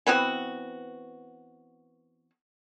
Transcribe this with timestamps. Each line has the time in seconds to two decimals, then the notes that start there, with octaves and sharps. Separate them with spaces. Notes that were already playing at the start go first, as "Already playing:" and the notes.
0.07 E3 B3 C4 F#4